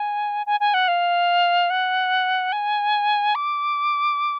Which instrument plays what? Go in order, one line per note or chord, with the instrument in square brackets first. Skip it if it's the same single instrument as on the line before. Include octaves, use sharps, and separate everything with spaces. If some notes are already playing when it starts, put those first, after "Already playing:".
Already playing: [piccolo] G#5
G#5
G#5
F#5
F5
F#5
G#5
D6